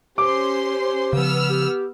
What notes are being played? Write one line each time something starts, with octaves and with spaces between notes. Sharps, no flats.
C#4 G4 C5 C6 D6
C#3 F3 B3 E6 F6
G4